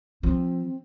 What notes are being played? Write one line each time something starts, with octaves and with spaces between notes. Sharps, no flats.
F3 C4